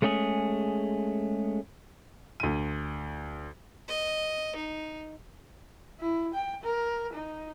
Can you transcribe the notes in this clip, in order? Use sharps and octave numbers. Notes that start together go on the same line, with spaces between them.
G#3 A3 C#4 G4 G#4
D2 D#7
D#5
D#4
E4
G5
A#4
D#4